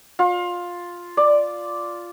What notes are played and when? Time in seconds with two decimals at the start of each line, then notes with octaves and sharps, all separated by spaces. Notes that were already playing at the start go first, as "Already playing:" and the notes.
0.19 F4
1.17 D5